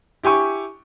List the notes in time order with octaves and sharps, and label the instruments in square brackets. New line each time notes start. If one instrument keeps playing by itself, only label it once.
[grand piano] E4 G4 G#5 C#6